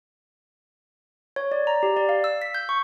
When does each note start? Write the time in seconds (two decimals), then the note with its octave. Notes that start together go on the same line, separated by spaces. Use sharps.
1.36 C#5
1.52 D5
1.67 A#5
1.83 G4
1.97 D5
2.09 F5
2.24 E6
2.42 B6
2.55 G6
2.69 C#6